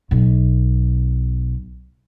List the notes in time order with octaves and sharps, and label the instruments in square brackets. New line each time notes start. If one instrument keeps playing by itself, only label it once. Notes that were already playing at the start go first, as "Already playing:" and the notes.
[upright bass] B1 B2